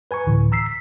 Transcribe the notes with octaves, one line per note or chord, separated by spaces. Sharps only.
B4 G#5 A#5 C#6
D2 A2 D3 E3
A#5 E6 B6 C7
B6